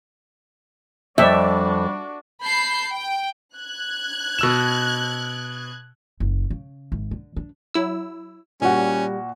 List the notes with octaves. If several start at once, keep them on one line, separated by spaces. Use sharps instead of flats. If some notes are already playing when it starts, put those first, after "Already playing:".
F2 G3 D4 F#4 D5 E5
A5 B5 G6 C7
G5
F#6 G#6
B2 E6 E7
F#1
C#3
G#1
D3
D4
F#3 E4 E6
A#2 G3 C#4 F#4